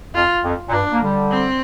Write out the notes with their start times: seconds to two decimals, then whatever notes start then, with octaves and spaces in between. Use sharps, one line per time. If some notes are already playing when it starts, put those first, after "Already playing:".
0.14 F2 F4
0.44 F2
0.69 A#2
0.72 G2 D4
0.92 A#3
1.02 D3 G3
1.31 C4